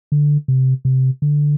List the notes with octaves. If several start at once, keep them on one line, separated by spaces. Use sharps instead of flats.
D3
C3
C3
D3